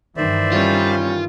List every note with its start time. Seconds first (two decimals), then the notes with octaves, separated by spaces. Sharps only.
0.17 G2 D#3 E3 C5 D5 E5
0.52 G3 C#4 F4